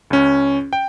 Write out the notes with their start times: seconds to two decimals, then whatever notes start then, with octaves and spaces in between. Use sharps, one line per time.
0.10 C#2 C#4
0.73 G5